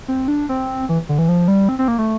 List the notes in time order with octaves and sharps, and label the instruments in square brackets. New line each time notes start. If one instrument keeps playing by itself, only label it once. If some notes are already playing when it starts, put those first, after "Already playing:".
[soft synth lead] C4
D4
C4
E3
D3
E3
F3
G3
C4
C4
A#3
A3